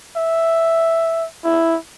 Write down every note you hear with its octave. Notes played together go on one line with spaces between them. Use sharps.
E5
E4